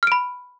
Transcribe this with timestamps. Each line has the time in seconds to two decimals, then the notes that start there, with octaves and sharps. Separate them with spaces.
0.03 F6
0.07 D7
0.12 B5